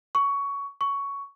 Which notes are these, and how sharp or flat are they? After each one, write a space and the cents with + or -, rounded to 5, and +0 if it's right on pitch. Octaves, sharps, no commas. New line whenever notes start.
C#6 +15
C#6 +10